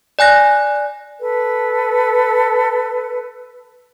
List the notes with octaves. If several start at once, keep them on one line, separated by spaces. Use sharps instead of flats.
D5 G#5 F#6 A#6
A4 B4